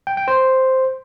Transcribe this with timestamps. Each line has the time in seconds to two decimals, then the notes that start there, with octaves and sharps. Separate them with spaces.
0.07 G5
0.17 G5
0.28 C5